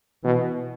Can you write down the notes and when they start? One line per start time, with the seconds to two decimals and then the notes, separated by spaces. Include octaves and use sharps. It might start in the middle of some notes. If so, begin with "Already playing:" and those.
0.23 B2 E3